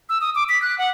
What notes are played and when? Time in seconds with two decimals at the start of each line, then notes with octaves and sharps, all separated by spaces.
0.09 E6
0.21 D#6
0.35 D6
0.49 B6
0.62 F#6
0.78 F#5